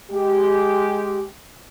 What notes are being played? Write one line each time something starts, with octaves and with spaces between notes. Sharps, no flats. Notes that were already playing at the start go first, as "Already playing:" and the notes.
G#3 G4